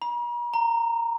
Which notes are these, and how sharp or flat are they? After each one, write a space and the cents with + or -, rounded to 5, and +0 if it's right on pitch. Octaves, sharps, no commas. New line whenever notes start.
A#5 +45
A#5 -10